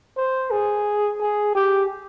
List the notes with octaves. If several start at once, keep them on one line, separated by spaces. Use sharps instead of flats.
C5
G#4
G#4
G4